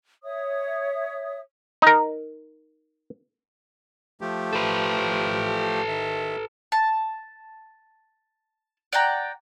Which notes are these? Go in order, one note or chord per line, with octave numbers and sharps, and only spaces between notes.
C#5 E5 D#6
D#4 A#4
F3 A3 G4
A4 B4
D#3 E5
A5
D5 F#5 G5 A#5